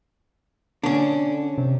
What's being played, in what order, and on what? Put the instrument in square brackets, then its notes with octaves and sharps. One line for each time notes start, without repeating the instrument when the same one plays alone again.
[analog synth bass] D3 [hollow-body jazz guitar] C#4 D4
[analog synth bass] C3